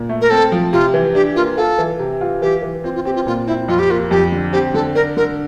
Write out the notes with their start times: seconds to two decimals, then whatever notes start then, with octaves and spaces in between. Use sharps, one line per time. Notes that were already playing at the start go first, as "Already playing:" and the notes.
Already playing: A#2
0.09 A3
0.21 A#4
0.30 C4 A4
0.52 F3
0.73 C3 F4
0.94 E3
1.15 D4 G4
1.36 A#3 F4
1.57 F4 A4
1.78 E3
1.99 C3
2.21 F4
2.42 E3 G4
2.62 E3
2.84 C4 F4
2.95 F4
3.05 C4 G4
3.15 F4
3.27 A#2 F4
3.47 C4 E4
3.68 F2 F4
3.79 G4
3.90 A#3 F4
4.11 F2 G4
4.32 D3
4.52 C4 G4
4.74 D3 A4
4.95 D4 A#4
5.17 D3 A#4